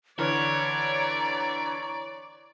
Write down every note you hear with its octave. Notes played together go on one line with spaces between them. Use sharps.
D3 E3 C#5 D5 A#5 F6